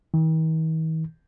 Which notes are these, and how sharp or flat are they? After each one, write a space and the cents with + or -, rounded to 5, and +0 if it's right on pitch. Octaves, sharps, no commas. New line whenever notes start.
D#3 +45